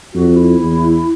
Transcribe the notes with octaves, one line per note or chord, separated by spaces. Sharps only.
F2 F#4
E4
E2